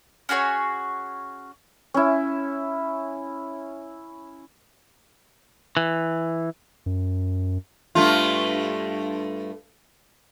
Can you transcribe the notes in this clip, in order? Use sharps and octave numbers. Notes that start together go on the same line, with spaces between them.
C#4 F#4 G#4 C#5
C#4 E4
E3
F#2
G2 A3 F4